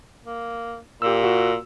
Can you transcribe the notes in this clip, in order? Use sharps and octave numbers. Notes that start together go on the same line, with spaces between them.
A#3
A#2 G4 E6
F#4